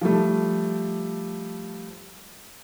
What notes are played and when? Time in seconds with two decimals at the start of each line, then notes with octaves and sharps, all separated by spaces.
0.01 F3 G3 A3